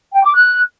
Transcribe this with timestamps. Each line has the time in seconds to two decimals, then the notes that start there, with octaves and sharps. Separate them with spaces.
0.13 G5
0.23 D6
0.33 F#6